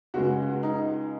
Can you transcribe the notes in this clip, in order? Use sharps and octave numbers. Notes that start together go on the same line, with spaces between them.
C#2 C#3 G#3 F#4
D#4